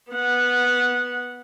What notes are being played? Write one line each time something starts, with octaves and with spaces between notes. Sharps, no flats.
B3 F#5